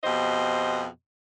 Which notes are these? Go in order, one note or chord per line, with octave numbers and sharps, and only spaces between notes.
F2 B2 G4 C5 D#5